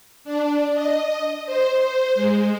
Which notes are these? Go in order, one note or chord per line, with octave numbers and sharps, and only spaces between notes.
D4
D#5
C5
C5
G#3